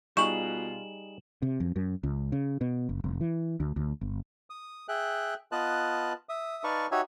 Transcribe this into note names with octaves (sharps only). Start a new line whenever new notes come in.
B2 G3 D#4 F4 G#4 C#6 E7 F#7
C3
F2
F#2
C#2
C#3
B2
F#1
F1
E3
D2
D2
G1
D#6
G#4 E5 G5 F#6
B3 F4 B4 D#5 A5 F#6
E5 D#6
D#4 B4 D5 F5 A5 C#6
D#4 F#4 G4 C#5 E5 G#5